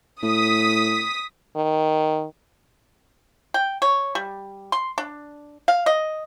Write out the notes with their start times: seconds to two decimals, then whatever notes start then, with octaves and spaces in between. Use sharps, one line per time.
0.23 A2 D#6 B6
1.56 D#3
3.54 G5
3.82 C#5
4.15 G3
4.72 C6
4.98 D4
5.68 F5
5.86 D#5